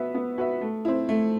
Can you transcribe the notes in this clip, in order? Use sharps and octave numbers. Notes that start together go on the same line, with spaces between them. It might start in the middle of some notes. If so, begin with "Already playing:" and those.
Already playing: B3 F#4 B4 E5
B3
F#4 B4 E5
A3
C4 E4
A3